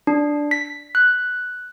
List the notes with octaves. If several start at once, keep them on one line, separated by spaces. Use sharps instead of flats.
D4
B6
F#6